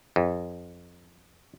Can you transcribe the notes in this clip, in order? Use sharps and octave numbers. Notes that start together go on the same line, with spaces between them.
F2